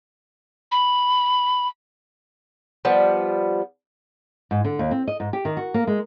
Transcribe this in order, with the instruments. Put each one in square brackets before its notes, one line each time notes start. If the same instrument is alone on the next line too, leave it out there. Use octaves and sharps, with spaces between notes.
[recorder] B5
[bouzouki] F3 G3 B3
[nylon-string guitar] G#2
D3
D#2
C4
D#5
G#2
G4
D#3
F#4
A#3
G#3